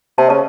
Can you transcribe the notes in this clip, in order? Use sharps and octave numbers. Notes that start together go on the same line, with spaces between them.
C3 A5
C#3 A5